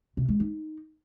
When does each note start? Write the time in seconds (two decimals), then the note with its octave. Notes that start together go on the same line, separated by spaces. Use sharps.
0.17 C3
0.28 G#3
0.40 D#4